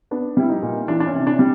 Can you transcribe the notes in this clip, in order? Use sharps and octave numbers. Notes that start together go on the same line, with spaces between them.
B3 D4
G3 E4
D#4
A#2
E3 D4
D4
C#4
C3
D4
G3